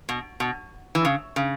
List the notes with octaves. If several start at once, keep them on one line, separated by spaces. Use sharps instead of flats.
B2
B2
E3
C#3
C#3